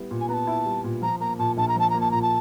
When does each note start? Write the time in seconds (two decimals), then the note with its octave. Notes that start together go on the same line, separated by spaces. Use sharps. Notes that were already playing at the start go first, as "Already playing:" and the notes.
Already playing: G3 B3 E4
0.11 A#2
0.21 G#5
0.29 B3 A#5
0.34 A5
0.47 E4
0.65 G3
0.84 A#2
1.02 F3 A#5
1.20 A#3 A#5
1.39 A#2 A5
1.57 A#1 A5
1.68 A#5
1.76 F3 A5
1.90 A#3 A#5
2.01 A5
2.11 A#2 A#5
2.22 A5